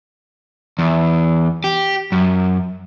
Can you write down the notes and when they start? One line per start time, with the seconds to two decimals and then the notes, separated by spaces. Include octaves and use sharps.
0.79 E2
1.64 G4
2.12 F#2